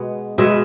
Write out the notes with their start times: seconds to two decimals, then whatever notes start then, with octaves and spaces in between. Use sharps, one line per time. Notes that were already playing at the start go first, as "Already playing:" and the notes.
Already playing: B2 G#3 B3
0.38 B2 G#3 B3 E5